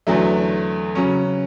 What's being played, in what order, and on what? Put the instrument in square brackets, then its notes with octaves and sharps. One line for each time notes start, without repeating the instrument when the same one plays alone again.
[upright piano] E2 D3 F#3 A3
C#3 F#3 C#4